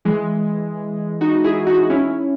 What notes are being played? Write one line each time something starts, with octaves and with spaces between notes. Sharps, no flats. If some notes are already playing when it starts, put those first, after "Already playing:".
E3 G#3
D#4 F#4
E4 G#4
D#4 F#4
C#4 E4